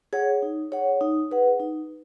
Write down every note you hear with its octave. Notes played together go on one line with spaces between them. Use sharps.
G#4 C#5 F#5
D#4
G#4 C#5 F#5
D#4
G#4 B4 F#5
D#4